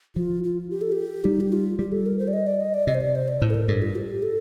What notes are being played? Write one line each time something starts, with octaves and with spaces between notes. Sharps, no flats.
F3 F4
F4
G4
A4
G4
G3 D#4
G4
F4
G3 G4
A4
A#4
C5
D5
D#5
D5
D#5
D5
C3 D#5
C5
D5
C5
D5
A2 C5
A4
A#4
G2 A4
F4
G4
A4